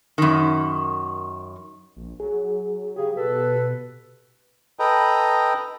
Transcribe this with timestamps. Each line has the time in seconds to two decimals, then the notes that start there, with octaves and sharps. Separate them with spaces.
0.18 F#2 D#3
1.97 A#1
2.20 F#3 G#4
2.96 C#3 G4 G#4
3.16 B2 A4 B4
4.79 A4 B4 D#5 G5 A#5